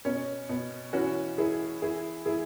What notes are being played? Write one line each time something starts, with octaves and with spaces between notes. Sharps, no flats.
B2 C#4
B2
E3 C#4 F#4
E3 E4 G#4
E3 E4 G#4
E3 E4 G#4